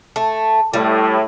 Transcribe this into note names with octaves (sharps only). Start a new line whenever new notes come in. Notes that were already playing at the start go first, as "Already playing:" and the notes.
A3
A2 G3